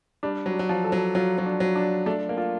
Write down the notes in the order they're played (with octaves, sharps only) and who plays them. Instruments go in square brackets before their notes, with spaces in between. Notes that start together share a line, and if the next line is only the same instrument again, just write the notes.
[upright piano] G3 [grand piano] D4
[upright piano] F#3
[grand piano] D4
[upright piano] F#3
F3
[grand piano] A4
[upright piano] F#3
[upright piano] F#3 [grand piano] F4
[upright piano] F#3
[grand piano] D4
[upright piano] F#3
[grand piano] D4
[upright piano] A3 [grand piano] D4
[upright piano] A#3
[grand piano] F4